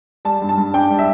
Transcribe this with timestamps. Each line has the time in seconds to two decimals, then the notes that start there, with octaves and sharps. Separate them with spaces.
0.25 G3 A5
0.42 G2
0.49 A5
0.58 G2
0.74 D4 G5
0.90 G3
0.99 E5